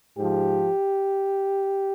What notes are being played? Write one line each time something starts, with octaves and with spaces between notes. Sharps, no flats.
G#2 F3 G4